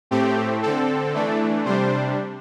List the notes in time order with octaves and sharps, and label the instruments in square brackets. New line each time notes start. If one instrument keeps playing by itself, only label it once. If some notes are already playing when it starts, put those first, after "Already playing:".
[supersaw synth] A2 A3 C4 G4
D3 C4 A4
E3 A3 D4
C3 G3 D4 C5